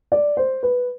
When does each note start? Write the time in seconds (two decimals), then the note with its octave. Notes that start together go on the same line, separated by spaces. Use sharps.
0.12 D5
0.37 C5
0.63 B4